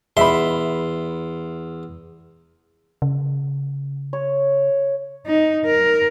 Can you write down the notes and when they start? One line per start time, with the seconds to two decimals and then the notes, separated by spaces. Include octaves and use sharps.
0.17 E2 E5 B5 C6
3.02 C#3
4.13 C#5
5.26 D#4
5.65 A#4